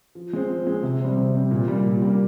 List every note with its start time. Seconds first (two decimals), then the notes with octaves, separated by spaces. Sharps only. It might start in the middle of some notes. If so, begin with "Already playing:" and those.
0.15 F3
0.33 G#3 C4
0.50 F3
0.67 G#3 C4
0.83 C3
1.00 G3 C4
1.17 C3
1.35 G3 C4
1.51 A#2
1.68 G3 A#3
1.85 A#2
2.02 G3 A#3